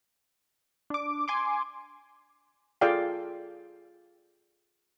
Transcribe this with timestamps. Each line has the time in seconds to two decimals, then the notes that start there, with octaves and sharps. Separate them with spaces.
0.90 D4 D6
1.28 G#5 C6 D6
2.81 F4 G#4 A4 D5 F5 G5